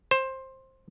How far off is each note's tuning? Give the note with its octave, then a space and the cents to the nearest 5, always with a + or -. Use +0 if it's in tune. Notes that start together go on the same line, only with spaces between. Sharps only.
C5 +15